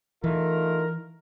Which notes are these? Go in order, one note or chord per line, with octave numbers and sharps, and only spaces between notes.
E3 A3 D#4 F4 A#4